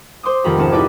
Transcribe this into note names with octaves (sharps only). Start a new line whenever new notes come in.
C5 C6 D6 D#6
F1 F2 D#3 G4 A#5 B5
G#1 C#4 A5
D#4 E4 G4 B4 D5 D6